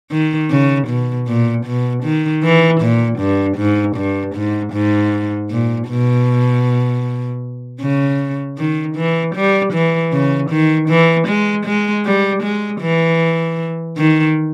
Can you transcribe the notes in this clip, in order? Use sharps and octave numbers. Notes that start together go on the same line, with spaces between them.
D#3
C#3
B2
A#2
B2
D#3
E3
A#2
G2
G#2
G2
G#2
G#2
A#2
B2
C#3
D#3
E3
G3
E3
C#3
D#3
E3
G#3
G#3
G3
G#3
E3
D#3